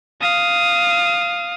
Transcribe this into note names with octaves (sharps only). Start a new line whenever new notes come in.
F5 D#6